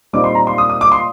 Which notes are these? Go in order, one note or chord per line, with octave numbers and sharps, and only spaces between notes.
A#2 G3 C4 D#4 D6
C6
A#5
C6
D#6
D#6
D6
C6